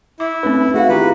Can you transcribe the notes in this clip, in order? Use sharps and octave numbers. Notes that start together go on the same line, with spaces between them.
E4 D6
A3 C4 C#4 D#4 B4
A3 F#4 G#4 F5
D#3 E4 F4 G4 B4 A#5